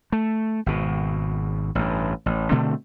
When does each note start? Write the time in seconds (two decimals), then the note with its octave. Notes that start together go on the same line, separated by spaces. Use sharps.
0.12 A3
0.66 G#1 B2
1.75 A1 G2
2.26 A1
2.51 B2 D3 A3 C4